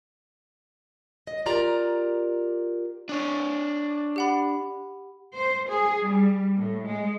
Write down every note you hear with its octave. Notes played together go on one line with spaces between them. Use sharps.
D#5
F4 G4 A#4 D5 A#5
D4 C#5
G4 F#5 B5
C5
G#4
G3
A2
G#3